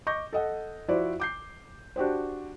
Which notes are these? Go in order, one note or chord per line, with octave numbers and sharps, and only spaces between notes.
D#5 C#6 D6 G6 A#6
A4 D#5 F#5
F3 E4 F#4 C5 D5
D6 G6 C7
D4 F#4 G4 C5